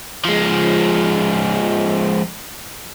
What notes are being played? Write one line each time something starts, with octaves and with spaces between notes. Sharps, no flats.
F3 G#3